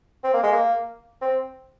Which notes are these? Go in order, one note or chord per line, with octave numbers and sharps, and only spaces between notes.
C4
A#3
G#3
A#3
C4